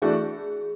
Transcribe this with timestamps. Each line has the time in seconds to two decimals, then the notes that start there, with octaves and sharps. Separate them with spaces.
0.02 E3 A3 D4 F#4 G#4